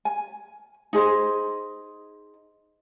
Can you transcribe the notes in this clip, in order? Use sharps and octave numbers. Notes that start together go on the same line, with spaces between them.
G#5
D#4 G#4 C5 D#5